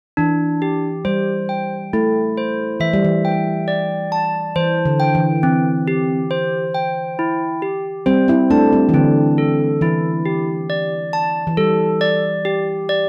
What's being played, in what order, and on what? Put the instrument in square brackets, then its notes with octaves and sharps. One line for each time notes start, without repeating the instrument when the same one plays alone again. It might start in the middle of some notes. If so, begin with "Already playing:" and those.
[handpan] E3 [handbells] D4
[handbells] G4
[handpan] G3 [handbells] C5
[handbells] G5
[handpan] A3 [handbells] E4
[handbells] C5
[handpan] E3 [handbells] E5
[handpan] G3
E3
[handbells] G5
D5
A5
[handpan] E3 [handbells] C5
[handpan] D3
[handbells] G5
[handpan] E3
[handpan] E3 [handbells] C4
[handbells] G4
C5
G5
E4
G4
[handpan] G3 C4 [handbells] C5
[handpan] C4 E4
[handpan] A3 D4 [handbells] A5
[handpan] G3 C4
E3
[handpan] D3 [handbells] C4
[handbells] A4
[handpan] E3 [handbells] E4
[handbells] G4
D5
A5
[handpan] E3
[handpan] G3 [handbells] A4
[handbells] D5
G4
D5